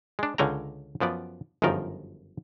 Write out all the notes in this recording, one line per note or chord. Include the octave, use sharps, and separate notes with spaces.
G#3 D4
C#2 D3 C#4 G5 A#5
F#2 F3 B3 D5
G1 F#2 D#3 F3 A#4